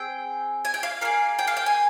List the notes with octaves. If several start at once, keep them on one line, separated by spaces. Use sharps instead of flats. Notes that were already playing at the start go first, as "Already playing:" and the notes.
Already playing: C4 G#4 G5
G#5
G5
F5
A#3 F4 G#4 F5
G5
F5
G5
G#5